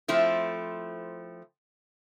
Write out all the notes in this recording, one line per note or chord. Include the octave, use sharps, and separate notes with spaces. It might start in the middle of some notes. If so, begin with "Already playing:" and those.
F3 A3 C4 E4